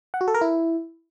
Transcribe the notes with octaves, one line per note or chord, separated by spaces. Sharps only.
F#5
F#4
A4
A#4
E4